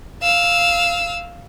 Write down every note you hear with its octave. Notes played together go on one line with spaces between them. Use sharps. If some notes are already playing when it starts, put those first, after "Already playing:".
F5 E6